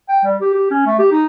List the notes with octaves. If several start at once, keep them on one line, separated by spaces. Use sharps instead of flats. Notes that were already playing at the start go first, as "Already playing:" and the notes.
G5
G3
G4
G4
C#4
A3
G4
D#4